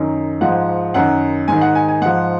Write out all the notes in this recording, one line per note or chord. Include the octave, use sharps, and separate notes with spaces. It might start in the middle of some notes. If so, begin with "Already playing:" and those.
Already playing: F#2 D#3
G#2 F3 F#5
F#2 D#3 F#5
G#2 D#3 G#5
F#5
G#5
G#5
G#2 F3 F#5